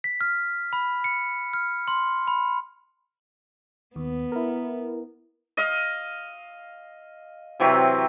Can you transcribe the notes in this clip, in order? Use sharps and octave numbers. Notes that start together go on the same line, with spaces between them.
B6
F6
B5
C#7
F6
C6
B5
D#2 B3
E4 A#4
D#5 F5
C3 E3 F#3 C4